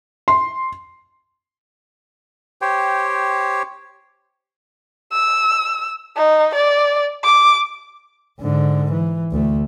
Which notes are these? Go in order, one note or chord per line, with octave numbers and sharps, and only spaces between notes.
C6
G4 C5 C#5 G5
E6
D#4
D5
D6
G#2 D3
E3
D2 A3